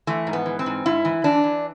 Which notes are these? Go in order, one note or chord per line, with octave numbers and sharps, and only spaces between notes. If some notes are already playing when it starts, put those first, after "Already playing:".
E3 A3
G#2
B3
E3
C4
G#2
G#2 E4
E3
E3 D4
E3